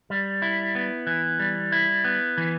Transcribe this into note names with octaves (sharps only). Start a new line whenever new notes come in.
G3
E4
B3
E3
G3
E4
B3
E3